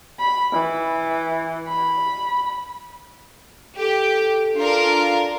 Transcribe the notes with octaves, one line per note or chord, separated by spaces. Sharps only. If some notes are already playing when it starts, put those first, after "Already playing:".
B5
E3
B5
G4 A4
D4 F4 A#4